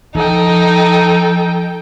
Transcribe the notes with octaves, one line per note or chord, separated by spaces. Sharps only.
F3 D#4 A4 G5